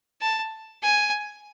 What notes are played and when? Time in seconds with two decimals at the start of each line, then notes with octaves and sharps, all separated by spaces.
0.21 A5
0.83 G#5